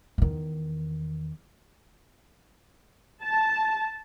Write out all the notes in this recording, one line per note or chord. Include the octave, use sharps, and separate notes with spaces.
E2 D#3
A5